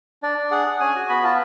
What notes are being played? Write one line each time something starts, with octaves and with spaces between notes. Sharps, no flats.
D4 D5
D4
G#4 F#5
G#4
C#4 G#5
F#4
B3 B5
F4 A5